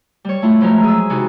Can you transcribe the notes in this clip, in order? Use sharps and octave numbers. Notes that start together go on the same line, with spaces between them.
G3 C#5
A3 E4 F4
F3 F#3 G#3 A3 A#4
G#4 E6
C3 E3 C#4 D#4 F#4